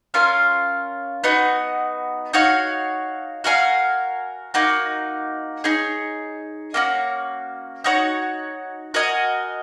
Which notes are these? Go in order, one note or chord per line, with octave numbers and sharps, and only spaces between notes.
C#4 F4 A#4 F5
B3 D#4 F#4
D#4 F#4 C#5 F5
F#4 A#4 F5 G#5
A#3 D#4 F#4
D#4 G#4 C#5
A#3 C#4 F#4
D#4 F#4 C#5
F#4 A#4 D#5 G#5